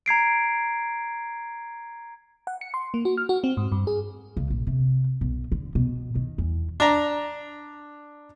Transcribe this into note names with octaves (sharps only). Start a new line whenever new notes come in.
A#5 G#6 C7 D7
F#5
C#7
C6
A#3
F#4
F6
F#4
C4
G#2
G2
G#4
C#2
A#1
C3
B1
D3
B2
D#3
E2
D4 A#5